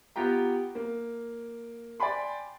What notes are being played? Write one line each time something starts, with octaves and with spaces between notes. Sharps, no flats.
B3 F4 G4 G5 A#5
A#3
D5 G5 G#5 B5 C6